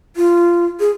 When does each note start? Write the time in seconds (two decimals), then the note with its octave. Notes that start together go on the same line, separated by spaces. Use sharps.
0.16 F4
0.80 G#4